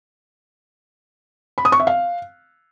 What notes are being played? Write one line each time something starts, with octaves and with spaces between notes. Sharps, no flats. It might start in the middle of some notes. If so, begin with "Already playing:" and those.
B5
D#6
C#6
E5
F5